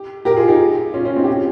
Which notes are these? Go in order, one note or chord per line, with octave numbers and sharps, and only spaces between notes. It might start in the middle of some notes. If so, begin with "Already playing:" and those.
Already playing: G4
G4 A#4
F4 G#4
D#4 G4
C#4 F4
C#4 F4
C4 D#4
G4
C#4 F4